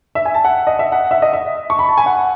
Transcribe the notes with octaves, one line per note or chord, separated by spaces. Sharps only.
E5
G#5
A5
F#5
D#5
E5
F#5
E5
D#5
E5
C#6
B5
A5
G#5
F#5